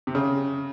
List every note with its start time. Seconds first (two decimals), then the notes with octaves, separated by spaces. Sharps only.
0.07 C3
0.15 C#3